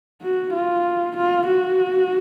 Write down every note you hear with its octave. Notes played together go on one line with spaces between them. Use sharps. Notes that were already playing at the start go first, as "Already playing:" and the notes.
F#4
F4
F4
F#4